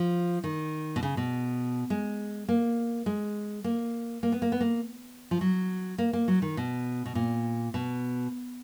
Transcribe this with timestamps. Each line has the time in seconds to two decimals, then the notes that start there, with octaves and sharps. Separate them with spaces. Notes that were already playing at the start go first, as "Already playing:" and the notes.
Already playing: F3
0.44 D#3
0.96 B2
1.03 C#3
1.17 B2
1.90 G#3
2.48 A#3
3.06 G#3
3.64 A#3
4.23 A#3
4.32 B3
4.42 A#3
4.52 B3
4.60 A#3
5.31 F3
5.41 F#3
5.98 A#3
6.13 A#3
6.28 F#3
6.42 D#3
6.57 B2
7.06 B2
7.15 A#2
7.74 B2